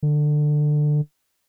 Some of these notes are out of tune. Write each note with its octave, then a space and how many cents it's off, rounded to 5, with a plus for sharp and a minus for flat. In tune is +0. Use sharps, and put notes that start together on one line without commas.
D3 +20